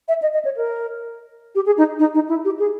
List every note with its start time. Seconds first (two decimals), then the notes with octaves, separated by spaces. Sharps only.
0.08 E5
0.22 D#5
0.33 D#5
0.45 C#5
0.57 A#4
1.55 G4
1.66 G#4
1.78 D#4
1.99 D#4
2.15 D#4
2.29 E4
2.45 G4
2.59 G#4